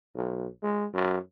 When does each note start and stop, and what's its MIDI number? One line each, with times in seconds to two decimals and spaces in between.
0.15 0.47 35
0.63 0.86 56
0.94 1.17 42